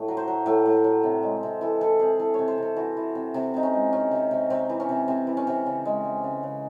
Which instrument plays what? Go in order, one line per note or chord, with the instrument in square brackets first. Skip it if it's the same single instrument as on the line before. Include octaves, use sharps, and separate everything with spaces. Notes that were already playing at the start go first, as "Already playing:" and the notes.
Already playing: [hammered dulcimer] A2 A3
F#3
C5
F#3
A2 A4
A2
F#3
C3
G#3
C3
E3 A4
E3 A4
C3 G#4
E3 A4
C3 C#5
C5
C3 A4
E3 F#4
E3
C3
C3
C3 D#4
C#4
G#3
C3 C#4
C3
C3
C3 C4
E3
C#4
C3
C3 C4
E3
C#4
C3
C#3
G#3
G#3
C#3
C#3